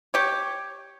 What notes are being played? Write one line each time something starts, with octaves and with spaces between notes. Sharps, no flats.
G4 C#5